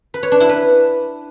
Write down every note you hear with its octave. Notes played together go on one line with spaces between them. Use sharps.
B4
C#5
D4
E4
B4